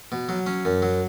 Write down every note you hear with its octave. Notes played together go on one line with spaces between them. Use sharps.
B2
F#3
C#4
F#2
F#3